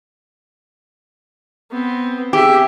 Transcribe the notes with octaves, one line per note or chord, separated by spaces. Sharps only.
B3 C4
G4 G#4 E5